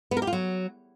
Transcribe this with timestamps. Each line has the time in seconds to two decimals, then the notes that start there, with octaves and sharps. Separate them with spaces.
0.11 B3
0.17 A#4
0.22 G4
0.27 F4
0.33 F#3